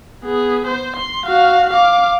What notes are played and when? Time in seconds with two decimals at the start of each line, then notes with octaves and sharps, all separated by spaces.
0.24 B3 G#4
0.67 C5
0.97 C6
1.26 F#4 F5
1.70 F5 D6